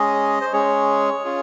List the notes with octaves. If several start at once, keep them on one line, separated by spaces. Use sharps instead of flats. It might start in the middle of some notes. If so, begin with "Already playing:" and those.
Already playing: G#3 C#4 G#4 D#5
C5
G#3 C#4 G#4 C#5
C#4 F4 G#4